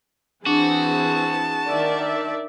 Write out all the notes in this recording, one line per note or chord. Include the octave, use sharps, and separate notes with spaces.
E3 C4 D4 F#4 G#4 A5
D#3 D5 E5